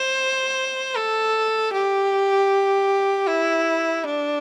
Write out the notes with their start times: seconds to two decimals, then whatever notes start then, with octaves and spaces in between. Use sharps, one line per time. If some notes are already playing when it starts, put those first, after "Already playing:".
Already playing: C5
0.95 A4
1.73 G4
3.27 E4
4.04 D4